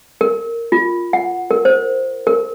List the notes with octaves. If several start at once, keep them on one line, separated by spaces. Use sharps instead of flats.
A#4
F4
F#5
A#4
C5
A#4